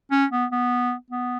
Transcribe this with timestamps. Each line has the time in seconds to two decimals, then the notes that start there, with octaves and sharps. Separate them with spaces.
0.11 C#4
0.31 B3
0.52 B3
1.10 B3